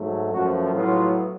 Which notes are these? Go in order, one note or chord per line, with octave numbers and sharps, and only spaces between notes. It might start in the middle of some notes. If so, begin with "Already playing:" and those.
Already playing: G#2 F#3 A3
F#2 F3 A3 F#4
A2 F#3 B3 F4